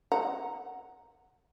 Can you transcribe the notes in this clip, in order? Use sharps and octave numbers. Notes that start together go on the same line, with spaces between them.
F#5 A#5